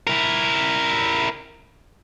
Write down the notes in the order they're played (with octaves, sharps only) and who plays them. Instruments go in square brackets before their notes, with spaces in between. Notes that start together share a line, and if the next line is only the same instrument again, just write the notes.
[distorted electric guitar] E4 A#4